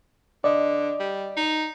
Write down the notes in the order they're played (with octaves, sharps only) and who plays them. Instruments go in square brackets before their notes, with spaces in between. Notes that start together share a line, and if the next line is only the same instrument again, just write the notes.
[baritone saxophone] D3 [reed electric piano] D5 D#5
[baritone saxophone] G3
D#4